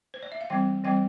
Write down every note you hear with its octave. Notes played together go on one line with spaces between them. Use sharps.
C5
D5
E5
F5
E3 G3 C4 G5
E3 G3 C4 G5